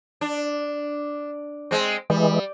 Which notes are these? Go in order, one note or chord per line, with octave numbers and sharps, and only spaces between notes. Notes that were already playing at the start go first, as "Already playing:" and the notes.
D4
G#3 C4
E3 G3 G#3